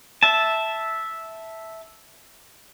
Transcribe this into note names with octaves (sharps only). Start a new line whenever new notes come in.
E5 A5